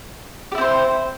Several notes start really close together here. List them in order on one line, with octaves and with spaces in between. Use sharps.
G4 E4 C4 C5